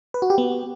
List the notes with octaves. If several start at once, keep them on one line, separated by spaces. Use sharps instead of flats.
B4
F#4
G4
B3